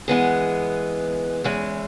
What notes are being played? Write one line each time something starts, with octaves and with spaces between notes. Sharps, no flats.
E3 G#3 B3 G#4
E2 E3 G#3 C#4